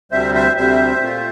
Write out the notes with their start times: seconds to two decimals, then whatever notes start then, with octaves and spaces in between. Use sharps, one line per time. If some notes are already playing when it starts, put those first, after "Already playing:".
0.11 D2 C3 G3 C4 C5 E5
0.34 C5 E5
0.56 D2 C3 G3 C4 C5 E5
1.01 A#2 A3 C4 F4